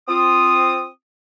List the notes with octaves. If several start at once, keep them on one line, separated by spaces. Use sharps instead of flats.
C4 F4 D#6